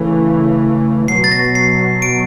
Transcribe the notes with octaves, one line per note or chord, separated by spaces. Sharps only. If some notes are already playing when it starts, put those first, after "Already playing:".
Already playing: C#3 E3 A3
B2 F#3 B3 C7
A6
A#6
C7
D7